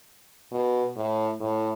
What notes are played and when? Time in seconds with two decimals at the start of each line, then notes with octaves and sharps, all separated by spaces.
0.52 B2
0.96 A2
1.40 A2